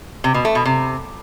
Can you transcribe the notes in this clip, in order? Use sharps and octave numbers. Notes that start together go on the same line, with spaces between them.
C3
B2
A3
B2
C3